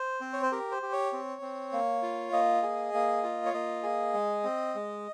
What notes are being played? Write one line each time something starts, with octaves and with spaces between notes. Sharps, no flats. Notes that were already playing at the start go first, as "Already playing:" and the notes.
Already playing: C5
C4
C#5
C5
G4 A#4
C5
G4
C#5
C4
C4
A#3
F4
A#3 D#5
G#4
A#3
F4
C#5
A#3 D#5
G#4
G#3
C4
G#3